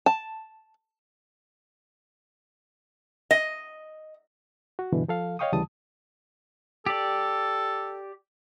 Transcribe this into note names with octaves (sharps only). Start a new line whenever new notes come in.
A5
D#5
F#4
G2 B2 D3 E3
F3 A4 F5
C#5 D#5 F5 G5 C#6 D#6
D2 C#3 E3 G3 A5 D#6
G4 A4 D5